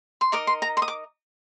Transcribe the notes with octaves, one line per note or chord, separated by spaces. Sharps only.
C6
D#4 A#4 D#5 D6
C6
A#5
C6
D#6
D6